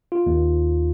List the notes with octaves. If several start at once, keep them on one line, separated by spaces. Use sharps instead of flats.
F4
D#2